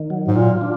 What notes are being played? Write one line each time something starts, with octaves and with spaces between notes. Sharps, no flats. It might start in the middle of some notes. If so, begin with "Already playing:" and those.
Already playing: D#3
F#3
G#2
A#2 F4
D4